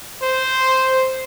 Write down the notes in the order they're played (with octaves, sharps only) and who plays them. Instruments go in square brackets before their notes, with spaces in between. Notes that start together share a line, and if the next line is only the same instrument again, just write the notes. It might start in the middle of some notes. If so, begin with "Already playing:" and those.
[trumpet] C5